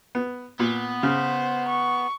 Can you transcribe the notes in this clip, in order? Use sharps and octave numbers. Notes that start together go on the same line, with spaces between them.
B3
A#2 B3
C#3 C5
C#6